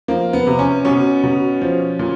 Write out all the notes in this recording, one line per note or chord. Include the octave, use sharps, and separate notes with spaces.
F3 A#3
B3
C3
C#4
B2 C#4
B2
F3
A#2